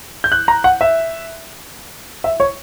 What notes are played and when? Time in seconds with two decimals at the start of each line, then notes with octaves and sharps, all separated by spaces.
0.24 G6
0.32 F#6
0.48 A#5
0.64 F#5
0.81 E5
2.24 E5
2.40 C#5